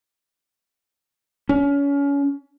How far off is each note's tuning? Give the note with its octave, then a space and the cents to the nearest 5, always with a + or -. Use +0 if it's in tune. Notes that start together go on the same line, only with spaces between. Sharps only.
C#4 +30